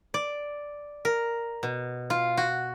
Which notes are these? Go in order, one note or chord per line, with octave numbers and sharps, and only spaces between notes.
D5
A#4
B2
F4
F#4